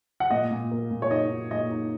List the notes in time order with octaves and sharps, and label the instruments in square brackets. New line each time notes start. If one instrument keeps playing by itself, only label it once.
[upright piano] F#5
A#2 D#5
A#2
A#3
A#2
C#5
D#4 D#5
D#4
A#2 D#5
D#4